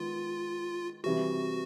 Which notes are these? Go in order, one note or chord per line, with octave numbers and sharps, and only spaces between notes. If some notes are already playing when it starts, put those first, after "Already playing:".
Already playing: D#3 G#3 B3 F4
C3 E3 G3 F#4